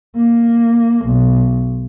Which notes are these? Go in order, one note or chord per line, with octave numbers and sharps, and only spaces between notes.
A#3
B1